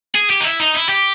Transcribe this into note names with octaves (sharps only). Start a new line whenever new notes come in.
G#4
G4
D#4
E4
D#4
E4
G4